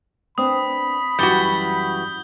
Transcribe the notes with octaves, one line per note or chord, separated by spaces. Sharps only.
B3 C4 D4 B5 D#6
F#2 E3 G3 F#4 G6 G7